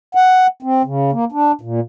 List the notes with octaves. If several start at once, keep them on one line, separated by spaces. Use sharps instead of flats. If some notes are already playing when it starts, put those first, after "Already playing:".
F#5
C4
C#3
A#3
D4
A#2